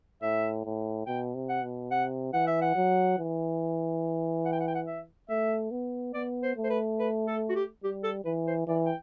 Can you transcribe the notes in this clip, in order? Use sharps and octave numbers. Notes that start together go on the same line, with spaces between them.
A2 E5
A2
B2 G5
C3
F#5
B2
C3 F#5
E3 F#5
E5
F#5
F#3
E3
F#5
G5
F#5
G5
F#5
E5
A3 E5
B3
B3 D5
C5
A3
C5
B4
B4
A4
F#4
G4
G3 G4
A4
E3 B4
C5
E3 D5
G5